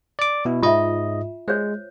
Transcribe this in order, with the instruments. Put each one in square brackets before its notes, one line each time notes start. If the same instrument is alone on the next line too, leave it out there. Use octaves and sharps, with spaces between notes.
[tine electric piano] D5 D6
B2 E4
[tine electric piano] G#2 G#3 D#5 [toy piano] F4 E5
[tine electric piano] G#3 [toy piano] C5 C#5